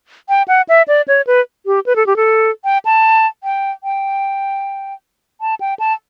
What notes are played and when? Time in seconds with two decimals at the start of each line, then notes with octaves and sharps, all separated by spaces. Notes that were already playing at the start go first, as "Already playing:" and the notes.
0.29 G5
0.48 F#5
0.69 E5
0.88 D5
1.08 C#5
1.27 B4
1.66 G4
1.86 B4
1.96 A4
2.06 G4
2.16 A4
2.64 G5
2.85 A5
3.44 G5
3.84 G5
5.41 A5
5.60 G5
5.79 A5